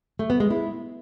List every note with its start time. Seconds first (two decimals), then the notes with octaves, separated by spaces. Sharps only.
0.19 A3
0.30 B3
0.40 G#3
0.51 E4